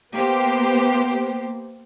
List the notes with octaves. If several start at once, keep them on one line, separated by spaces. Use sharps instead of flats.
A#3 B3 G4 C5